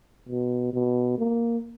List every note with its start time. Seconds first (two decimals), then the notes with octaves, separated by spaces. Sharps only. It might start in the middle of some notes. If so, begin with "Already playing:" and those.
0.29 B2
0.73 B2
1.18 A#3